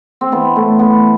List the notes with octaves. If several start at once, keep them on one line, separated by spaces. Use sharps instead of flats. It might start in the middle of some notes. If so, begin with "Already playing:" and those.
C4
E3 B3
A2 A3
E3 B3